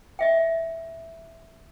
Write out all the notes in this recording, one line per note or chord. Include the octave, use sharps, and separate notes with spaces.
D#5 E5 G5